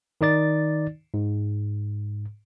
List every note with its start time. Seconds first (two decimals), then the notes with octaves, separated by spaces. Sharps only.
0.21 D#3 D#4 D5 A6
1.14 G#2